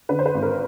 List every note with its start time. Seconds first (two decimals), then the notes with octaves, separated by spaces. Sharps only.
0.09 D3 B4
0.19 C5
0.26 B4
0.34 G#1
0.42 A#4